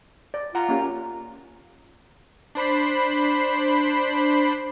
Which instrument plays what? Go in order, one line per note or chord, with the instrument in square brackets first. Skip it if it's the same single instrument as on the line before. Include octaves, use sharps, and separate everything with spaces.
[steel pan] D5
[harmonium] F4 [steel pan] F#5 [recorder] A#5
[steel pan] A#3 C#4 G4
[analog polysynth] D4 C5 B5 C7